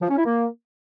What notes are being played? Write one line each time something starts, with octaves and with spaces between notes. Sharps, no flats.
F3
C#4
E4
A#3